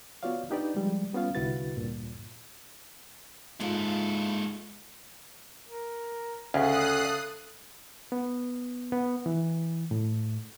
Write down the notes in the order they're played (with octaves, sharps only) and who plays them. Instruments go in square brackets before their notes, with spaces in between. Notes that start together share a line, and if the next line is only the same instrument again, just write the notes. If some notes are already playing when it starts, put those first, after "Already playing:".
[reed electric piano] B3 F4 F#4 C#5 D5 F5
D4 D#4 G4 B4 D5
F3 G3 G#3
G3 B3 C#4 F4 F5
C2 D3 E4 F#4 B4 A6
D2 G2 A#2
[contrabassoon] G#2 [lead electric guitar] G#3 A4 [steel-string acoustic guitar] E4 F4
[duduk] A#4
[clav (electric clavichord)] D2 [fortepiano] C#3 [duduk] A4 [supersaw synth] D#6 F#6 C7
[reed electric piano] B3
B3
E3
A2